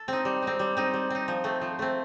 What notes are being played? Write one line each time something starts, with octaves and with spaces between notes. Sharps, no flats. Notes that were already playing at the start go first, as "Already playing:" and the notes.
Already playing: A4
C4 D#4
G3
C4 D#4
G3
C4 D#4
G3
C4 D#4
F3
A3 C4
F3
A3 C4